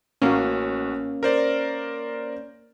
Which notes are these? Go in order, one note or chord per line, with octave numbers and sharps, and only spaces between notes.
A1 A#3 C#4 F#4
A#4 C5 D5